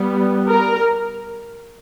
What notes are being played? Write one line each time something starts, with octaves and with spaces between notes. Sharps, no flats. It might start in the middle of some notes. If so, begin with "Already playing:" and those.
Already playing: G3 B3
A#4